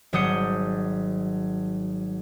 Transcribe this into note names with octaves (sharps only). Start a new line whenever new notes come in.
G#1 F#3 G3 D#6 G6 C#7